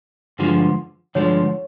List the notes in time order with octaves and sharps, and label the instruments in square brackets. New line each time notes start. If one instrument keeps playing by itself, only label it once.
[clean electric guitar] G2 D3 F3 G#3
[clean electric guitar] G2 D3 F3 G#3 [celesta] C#5